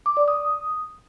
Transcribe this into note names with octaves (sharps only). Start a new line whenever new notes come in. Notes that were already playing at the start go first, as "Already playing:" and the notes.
D6
D5
D#6